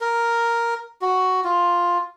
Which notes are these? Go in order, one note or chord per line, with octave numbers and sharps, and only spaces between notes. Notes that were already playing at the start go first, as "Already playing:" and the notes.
A#4
F#4
F4